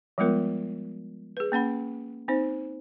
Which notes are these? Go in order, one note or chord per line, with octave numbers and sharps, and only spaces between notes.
F3 G3 G#3 B3 F4 A#4
G#4 B4
A#3 C#4 F#5 B5
C4 D#4 C5